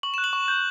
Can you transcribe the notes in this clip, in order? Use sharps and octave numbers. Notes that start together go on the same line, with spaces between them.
C#6 F#7
F#6 E7
F#7
C#6
G6